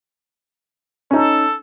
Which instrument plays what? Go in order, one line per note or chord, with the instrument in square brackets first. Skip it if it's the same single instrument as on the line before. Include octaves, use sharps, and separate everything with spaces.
[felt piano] C#4 D#4 [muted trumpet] A4